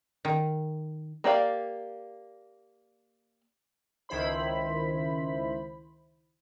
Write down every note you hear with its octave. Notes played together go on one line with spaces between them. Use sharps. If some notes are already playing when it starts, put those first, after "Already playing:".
D#3
A#3 G4 D5 F5
C#2 D#3 E4 C5 B5